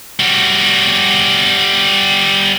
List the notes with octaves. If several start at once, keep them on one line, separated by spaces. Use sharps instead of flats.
G3 F#4